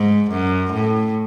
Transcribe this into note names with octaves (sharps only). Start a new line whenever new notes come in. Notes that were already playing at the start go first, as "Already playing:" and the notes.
Already playing: G#2
F#2
A2